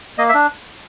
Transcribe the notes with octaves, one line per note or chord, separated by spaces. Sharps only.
A#3 D#5
E5
D4